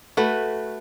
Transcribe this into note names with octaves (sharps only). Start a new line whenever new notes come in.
A3 F#4 B4